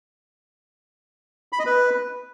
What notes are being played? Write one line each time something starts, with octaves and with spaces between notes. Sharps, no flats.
B5
D#5
B4